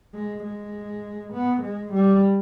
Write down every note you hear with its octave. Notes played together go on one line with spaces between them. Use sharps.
G#3
G#3
B3
G#3
G3